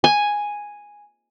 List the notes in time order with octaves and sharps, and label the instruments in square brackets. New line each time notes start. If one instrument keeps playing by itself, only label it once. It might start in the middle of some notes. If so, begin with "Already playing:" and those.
[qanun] G#5